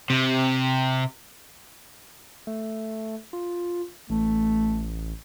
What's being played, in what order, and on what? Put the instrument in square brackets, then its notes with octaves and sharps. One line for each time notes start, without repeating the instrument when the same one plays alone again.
[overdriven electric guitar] C3
[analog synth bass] A3
F4
[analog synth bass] A1 [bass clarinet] A3